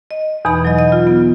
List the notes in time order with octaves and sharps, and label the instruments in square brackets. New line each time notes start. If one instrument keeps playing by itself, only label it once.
[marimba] D#5
E2 B2 E3 D#4 B5
F#3 D#5
D#5
F4
B3